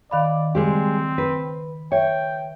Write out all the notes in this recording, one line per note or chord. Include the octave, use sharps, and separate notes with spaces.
D#3 D5 F5 B5
C#3 G3 G#3 C4 G4
B4
C#5 E5 G5